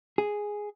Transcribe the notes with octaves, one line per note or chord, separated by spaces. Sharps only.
G#4